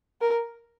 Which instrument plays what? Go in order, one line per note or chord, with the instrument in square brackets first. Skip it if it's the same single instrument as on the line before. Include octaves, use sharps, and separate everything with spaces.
[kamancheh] A#4